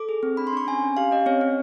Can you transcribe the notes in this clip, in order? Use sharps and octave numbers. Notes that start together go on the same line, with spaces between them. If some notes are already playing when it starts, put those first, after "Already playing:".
Already playing: A4 D6
G#4
C4
D4 B5
C6
D4 C#6
C#4 G#5
C#4
G4 F5
C#4 D#5
C4 C#5
C4